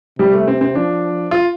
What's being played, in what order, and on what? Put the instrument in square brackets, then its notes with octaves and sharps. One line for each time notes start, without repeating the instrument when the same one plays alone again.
[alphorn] C3 [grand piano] G3
[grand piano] A3
C4
C4
[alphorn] F3 [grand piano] D4
[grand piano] F4